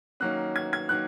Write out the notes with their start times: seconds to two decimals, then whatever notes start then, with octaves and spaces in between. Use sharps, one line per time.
0.20 D#3 F#3 A#3 C#4 F#6
0.56 G#6
0.73 G#6
0.89 D#3 F#3 A#3 F#6